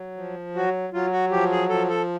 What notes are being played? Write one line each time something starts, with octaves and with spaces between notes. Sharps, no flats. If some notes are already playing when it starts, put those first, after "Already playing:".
Already playing: F#3
F3
F#3 F#4
F#3 F4
F#4
F3 G4
G#4
F3 A4
A4